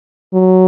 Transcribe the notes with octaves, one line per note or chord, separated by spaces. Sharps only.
F#3